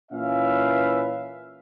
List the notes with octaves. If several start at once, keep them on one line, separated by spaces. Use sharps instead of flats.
A#2 E3 C#4 B4 E5 F5